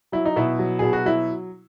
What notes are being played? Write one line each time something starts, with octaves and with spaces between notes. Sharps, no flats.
F#3 E4
D#4
B2 E4
F#3
B2 G#4
F#4
F#3 E4